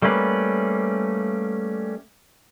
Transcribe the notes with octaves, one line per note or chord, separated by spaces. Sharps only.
G3 A3 A#3 C#4 B4